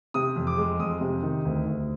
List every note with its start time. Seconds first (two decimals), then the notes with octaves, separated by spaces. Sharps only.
0.14 C3 D#6
0.36 F2
0.47 D6
0.58 G#3
0.79 F2 D#6
1.01 C3
1.23 D#3
1.45 D2
1.66 D2